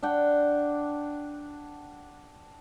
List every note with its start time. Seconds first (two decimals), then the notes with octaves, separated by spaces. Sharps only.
0.03 D4 F#5 G5